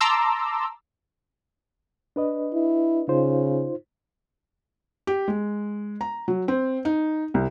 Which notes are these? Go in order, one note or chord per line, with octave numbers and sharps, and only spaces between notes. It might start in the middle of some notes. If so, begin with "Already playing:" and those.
A5 A#5 C6 D6 E6
D4 B4 D#5
E4
C#3 D#4 F4 C5
G4
G#3
A#5
F#3
C4
D#4
C2